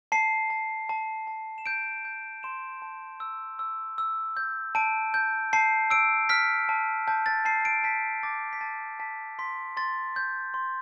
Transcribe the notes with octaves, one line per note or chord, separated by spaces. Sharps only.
A5 C7
A5
A5
A5
E7
G6 D7
G6
C6 E7
A5
E6
E6
E6
G6
A5 D7
G6
A5 C7
E6 D7
F6 B6
A5
A5 G6
A6
A5 C7
D7
A5 B6
D6 A6
B6
A5 A6
A5 B6
C6 B6
C6 A6
G6
C6